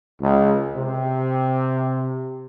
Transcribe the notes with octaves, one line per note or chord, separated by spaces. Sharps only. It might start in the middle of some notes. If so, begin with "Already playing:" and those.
C#2
C3